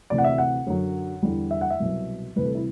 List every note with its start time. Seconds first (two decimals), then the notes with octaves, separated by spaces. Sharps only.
0.10 D2 C3 E3 D5
0.18 F#5
0.24 E5
0.38 F#5
0.67 F#2 D3 F#3
1.23 E2 D3 G3
1.51 E5
1.61 F#5
1.70 E5
1.80 C2 B2 F#3
2.36 D2 C3 E3 G3 B4
2.45 A4
2.55 E4